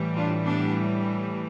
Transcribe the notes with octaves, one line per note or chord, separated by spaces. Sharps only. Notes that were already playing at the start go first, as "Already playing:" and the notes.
Already playing: A2 E3 G3
D4 F4
B3 D4